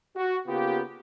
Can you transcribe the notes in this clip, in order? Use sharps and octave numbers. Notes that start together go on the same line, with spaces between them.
F#4
C#3 A#3 B3 F4 G4